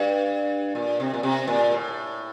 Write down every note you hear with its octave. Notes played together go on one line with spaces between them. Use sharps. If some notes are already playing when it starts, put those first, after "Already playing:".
Already playing: G2
A#2
C3
A#2
C3
A#2
A2